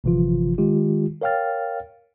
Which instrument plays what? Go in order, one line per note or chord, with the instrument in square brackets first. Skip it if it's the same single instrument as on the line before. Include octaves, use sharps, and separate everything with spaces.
[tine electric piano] G1 C3 E3 F3 F4
D#3 G#3 F4 G4
A#4 C#5 F5 G5 F6 A6